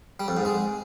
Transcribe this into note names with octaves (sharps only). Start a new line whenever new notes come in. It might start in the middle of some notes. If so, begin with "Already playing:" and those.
G3
F2
G#2
G#3